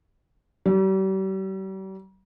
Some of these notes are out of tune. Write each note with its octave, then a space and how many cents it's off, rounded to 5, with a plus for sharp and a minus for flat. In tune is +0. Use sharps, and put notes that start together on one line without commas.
G3 -40